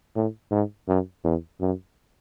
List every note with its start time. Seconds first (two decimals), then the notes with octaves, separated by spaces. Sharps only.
0.16 A2
0.51 G#2
0.88 F#2
1.24 E2
1.61 F#2